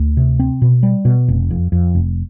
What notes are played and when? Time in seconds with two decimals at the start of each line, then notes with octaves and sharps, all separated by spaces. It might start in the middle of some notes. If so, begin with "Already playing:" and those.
Already playing: D2
0.17 C3
0.39 C4
0.62 B2
0.83 G3
1.05 B2
1.28 F1
1.51 F2
1.72 F2
1.95 F1